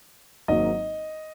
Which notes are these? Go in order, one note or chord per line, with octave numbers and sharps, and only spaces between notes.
G#1 G#2 F#3 A#3 D#5